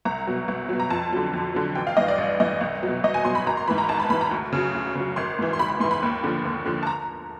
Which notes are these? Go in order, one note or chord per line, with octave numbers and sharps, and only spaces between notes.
C2 A#5
B2 F#3
C2
B2 F#3
A#5
F2 A5
D3 F#3
F2
D3 F#3
A1 G5
F5
G2 E3 D#5
D5
A1
G2 E3 D#5
C2
B2 F#3
C2 D#5
G#5
B2 F#3 C6
B5
G#1 A#5
C6
G#2 E3 B5
A#5
G#1 A5
B5
G#2 E3 B5
A#5
D2
C#3 F#3
D2
C#3 F#3
G#1 C6
G#2 E3
C6
G#1 B5
B5
G#2 E3 C6
B5
D#2
D3 F3
D#2
D3 F3
A5
A#5